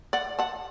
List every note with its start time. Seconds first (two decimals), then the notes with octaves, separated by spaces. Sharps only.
0.13 D5 F#5
0.39 F#5 A5